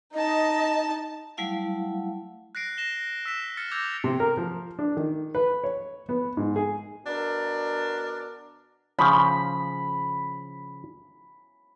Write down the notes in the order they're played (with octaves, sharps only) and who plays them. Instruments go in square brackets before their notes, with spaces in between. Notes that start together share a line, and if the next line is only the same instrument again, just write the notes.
[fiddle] D#4 A5 [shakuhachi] D#5
[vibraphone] F#3 G3 A3 E4 F5 F#5
[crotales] F#6 A#6 C7 D7
A#6 E7 G7
E6 B6 E7
F6 A6 C#7
D6 E6 G6 G#6 A#6 F7
[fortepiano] C3
A#4
F3
D4
D#3
B4
C#5
B3
G#2
G#4
[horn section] B2 D4 A#4
[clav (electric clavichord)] C#3 F3 [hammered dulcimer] B5